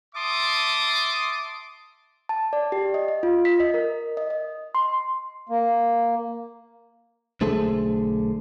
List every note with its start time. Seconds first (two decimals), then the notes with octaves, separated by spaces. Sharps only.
0.15 E5 A5 C6 D6 D#6
2.29 A5
2.53 D5
2.72 G4
2.94 D#5
3.08 D#5
3.23 F4
3.45 B6
3.60 D#5
3.74 A#4
4.17 D#5
4.30 D#5
4.75 C6
5.49 A#3
7.41 B1 D3 A3 G#4 A4 C5